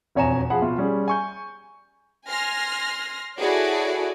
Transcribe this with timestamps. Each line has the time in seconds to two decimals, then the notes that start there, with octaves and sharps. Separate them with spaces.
0.15 E1 F2 C#5 G#5 A#5 E7
0.50 F3 G#4 F#5 B5
0.62 B2 F4
0.78 G3 C#4 G#4
1.08 G#5 C#6 G6
2.28 G#5 C6 F6 A#6
3.39 E4 F#4 G#4 A4 C#5 D5